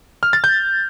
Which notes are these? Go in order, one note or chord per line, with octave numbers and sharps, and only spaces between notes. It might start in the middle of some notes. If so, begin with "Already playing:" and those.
F6
A6
G6